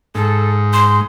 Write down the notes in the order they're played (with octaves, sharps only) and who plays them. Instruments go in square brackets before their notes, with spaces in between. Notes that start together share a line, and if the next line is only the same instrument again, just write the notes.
[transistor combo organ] G#2 [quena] A4
[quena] C6